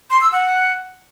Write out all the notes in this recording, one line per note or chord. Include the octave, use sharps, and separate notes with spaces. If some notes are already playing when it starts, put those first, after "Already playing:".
C6
E6
F#5